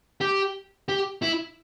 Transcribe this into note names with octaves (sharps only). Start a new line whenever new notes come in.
G4
G4
E4